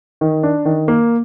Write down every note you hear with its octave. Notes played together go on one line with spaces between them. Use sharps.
D#3
D4
D#3
A#3